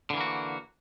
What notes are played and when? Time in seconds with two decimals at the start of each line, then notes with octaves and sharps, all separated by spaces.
0.10 D3
0.14 E3
0.17 A#3
0.21 F#4